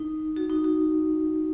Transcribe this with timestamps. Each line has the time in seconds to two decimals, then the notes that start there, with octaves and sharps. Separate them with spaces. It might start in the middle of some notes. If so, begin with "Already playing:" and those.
Already playing: D#4
0.36 F#4
0.50 D#4
0.64 F#4